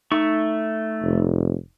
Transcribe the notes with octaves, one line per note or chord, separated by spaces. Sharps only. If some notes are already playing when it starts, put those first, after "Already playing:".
A3 D#4 C#6
F1